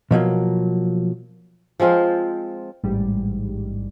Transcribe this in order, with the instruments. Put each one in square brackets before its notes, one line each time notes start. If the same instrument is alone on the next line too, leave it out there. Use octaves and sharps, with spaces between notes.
[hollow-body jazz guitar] B2 F3 F#3 A#3
[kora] F3 G#3 C4 F4
[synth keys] A1 G#2 G3